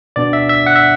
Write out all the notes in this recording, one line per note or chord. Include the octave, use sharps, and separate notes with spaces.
B2 B3 D4 D5
E5
E5
F#5
E5